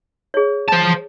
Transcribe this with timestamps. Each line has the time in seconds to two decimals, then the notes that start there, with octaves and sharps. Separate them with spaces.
0.34 G#4 C#5
0.69 C5 A5